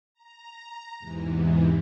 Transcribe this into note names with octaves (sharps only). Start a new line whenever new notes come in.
A#5
E2 G#2 C3 E3